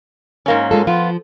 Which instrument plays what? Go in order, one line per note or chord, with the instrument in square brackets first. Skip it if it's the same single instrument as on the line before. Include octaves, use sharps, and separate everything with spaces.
[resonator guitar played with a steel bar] G#2 A#3 C#4
[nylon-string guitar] G#3 F4 A4
[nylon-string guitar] F3 [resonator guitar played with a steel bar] B3 F4